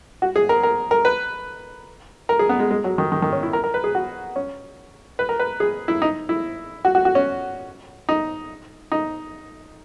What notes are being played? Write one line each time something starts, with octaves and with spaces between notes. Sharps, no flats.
F#4
G#4
A#4
A#4
A#4
B4
A#4
G#4
B3
G#3
G#3
F#3
D#3
D#3
D#3
C#4
E4
A#4
A#4
B4
G#4
F#4
C#4
B4
A#4
B4
G#4
E4
D#4
E4
F#4
F#4
F#4
C#4
D#4
D#4